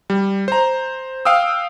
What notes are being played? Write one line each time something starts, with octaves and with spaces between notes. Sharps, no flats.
G3
C5 A#5
F5 G5 D#6 E6